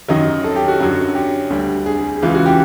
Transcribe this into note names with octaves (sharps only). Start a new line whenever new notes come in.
F#2 D#3 F#3 D#5
A4
G4
F#4
F#2 D3 F#3
G4
D2 D3 G3
G#4
G#4
C#2 C#3 E3 F4
F#4
G4